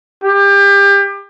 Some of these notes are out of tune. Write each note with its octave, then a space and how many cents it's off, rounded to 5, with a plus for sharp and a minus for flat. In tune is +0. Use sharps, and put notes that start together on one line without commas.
G4 +30